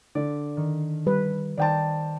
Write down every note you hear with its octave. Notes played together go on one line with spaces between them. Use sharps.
D3 D5
D#3
G3 B4
D#3 C5 D5 G5 A5